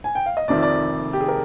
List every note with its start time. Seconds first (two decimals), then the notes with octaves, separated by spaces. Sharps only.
0.04 G#5
0.15 G5
0.26 F5
0.37 D#5
0.48 F1 F2 C3 D#3 D5
0.62 D5
1.13 G4
1.21 G#4
1.28 A#4